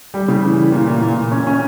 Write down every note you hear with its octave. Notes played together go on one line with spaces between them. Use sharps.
G3
C#3
E3
E3
A#2
A#2
A#2
A#2
C#4
C#4